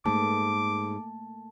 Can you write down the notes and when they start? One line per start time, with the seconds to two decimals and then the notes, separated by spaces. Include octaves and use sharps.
0.06 G#2 A3 A#3 A5 D6